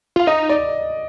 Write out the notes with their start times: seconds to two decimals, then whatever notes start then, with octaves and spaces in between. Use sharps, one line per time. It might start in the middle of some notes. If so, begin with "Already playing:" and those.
0.16 F4 F5
0.27 D#4 D#5
0.49 D5